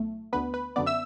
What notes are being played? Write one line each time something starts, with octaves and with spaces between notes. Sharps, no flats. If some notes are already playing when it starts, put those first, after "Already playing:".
Already playing: B1 A2 A3
D2 D3 B3 B4
B4
F#2 D3 B3 D5
E5 E6